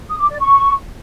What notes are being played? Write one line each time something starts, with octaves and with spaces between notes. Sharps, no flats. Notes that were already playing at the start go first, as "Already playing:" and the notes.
D#6
D6
D5
C#6